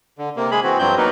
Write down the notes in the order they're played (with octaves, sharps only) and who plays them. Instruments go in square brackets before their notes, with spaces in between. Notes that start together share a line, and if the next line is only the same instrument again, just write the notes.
[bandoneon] D3
C3 A#3
G#3 G#4 B5
E3 C4 F#4
G2 F3 F#3 C4 G6
F#3 A#3 B3 D#4 A#4 B4